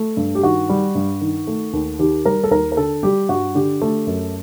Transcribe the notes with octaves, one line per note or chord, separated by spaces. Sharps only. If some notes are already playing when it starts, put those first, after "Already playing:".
Already playing: A3
G2
G4
D#3 F#4
G3
G2
D#3
A3
D#2
D#3 G4
G3 A#4
A4
D#2 A#4
A#4
D3 A4
G3 G4
G2 F#4
D3 G4
A3
F#2